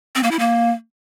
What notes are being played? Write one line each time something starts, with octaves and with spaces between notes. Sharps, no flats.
C4
A#3
E4
A#3